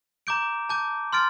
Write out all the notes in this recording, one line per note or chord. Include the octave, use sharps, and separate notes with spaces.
A#5 D6 G6 D7
A5 D6 G6
C6 F6 A6 D7